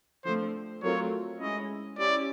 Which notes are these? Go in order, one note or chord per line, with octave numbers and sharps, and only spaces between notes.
D3 F3 A3 C4 C5
F#3 A3 C4 F4 A#4 C#5
G#3 C#4 E4 D#5
C#4 E4 G4 D5